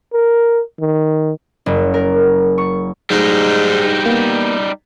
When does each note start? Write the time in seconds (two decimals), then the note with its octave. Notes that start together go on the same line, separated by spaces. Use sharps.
0.13 A#4
0.80 D#3
1.66 F#1
1.94 A#4
2.58 C#6
3.10 G#2 F#3 G3 A3 D#4
4.06 A#3 B3